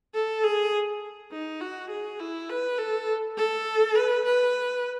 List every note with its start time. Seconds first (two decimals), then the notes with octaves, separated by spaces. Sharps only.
0.14 A4
0.44 G#4
1.31 D#4
1.61 F#4
1.90 G#4
2.20 E4
2.49 B4
2.78 A4
3.37 A4
3.95 B4
4.25 B4